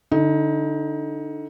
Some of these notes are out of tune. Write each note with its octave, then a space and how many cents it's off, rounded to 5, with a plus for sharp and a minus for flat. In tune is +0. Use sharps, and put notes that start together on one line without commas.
D3 +0 D#4 +25